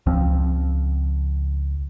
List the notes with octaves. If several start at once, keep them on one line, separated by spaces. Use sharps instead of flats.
C#2 F3 C4